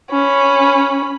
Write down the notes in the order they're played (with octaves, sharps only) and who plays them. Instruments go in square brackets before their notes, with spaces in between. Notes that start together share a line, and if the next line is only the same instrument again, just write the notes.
[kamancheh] C#4 B5